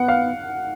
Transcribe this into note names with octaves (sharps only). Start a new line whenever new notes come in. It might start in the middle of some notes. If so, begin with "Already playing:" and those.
Already playing: B3 F#5
F5